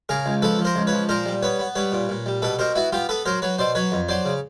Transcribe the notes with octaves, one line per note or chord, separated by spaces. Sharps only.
C#3 G#4 A#4
C#2
F3 A4 B4
F3
A#4 C5
C#2
B4 C#5
F3
A#2 A#4 C5
G3
B3 B4 C#5
B3
G3 B4 C#5
A#2
A#2
G3
B2 A4 B4
B2 A#4 C5
B3 E4 F#4
B3 F4 G4
B3 A4 B4
F#3 A#4 C5
F#3 B4 C#5
B2 C5 D5
F#3 B4 C#5
F2
F#3 C5 D5
C#3